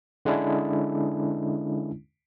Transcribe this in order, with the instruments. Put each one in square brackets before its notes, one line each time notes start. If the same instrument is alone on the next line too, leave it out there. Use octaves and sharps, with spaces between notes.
[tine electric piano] D3 G#3 C#4 D4 E4